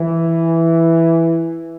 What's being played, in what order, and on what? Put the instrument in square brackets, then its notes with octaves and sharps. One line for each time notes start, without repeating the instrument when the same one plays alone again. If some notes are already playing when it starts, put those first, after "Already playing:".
Already playing: [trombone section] E3